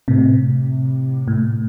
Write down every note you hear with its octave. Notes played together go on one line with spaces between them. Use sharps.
A2 C3
A2